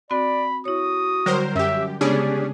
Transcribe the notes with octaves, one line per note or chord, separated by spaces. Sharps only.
C4 F#4 D5 B5
E4 F#4 C#5 D#6
D3 F#3 G3 A#4 C5
F#2 G4 E5
C#3 G#3 B3 C#4 D4 G4 G#4 D5